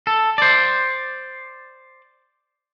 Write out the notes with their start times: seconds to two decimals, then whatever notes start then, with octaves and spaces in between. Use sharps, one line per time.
0.07 A4
0.38 C5 D5